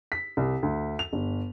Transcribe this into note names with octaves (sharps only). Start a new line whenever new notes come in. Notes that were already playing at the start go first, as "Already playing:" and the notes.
B6
C2
D2
F7
G1